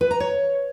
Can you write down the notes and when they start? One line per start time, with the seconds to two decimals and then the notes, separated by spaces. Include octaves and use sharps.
0.01 B4
0.11 A#5
0.20 C#5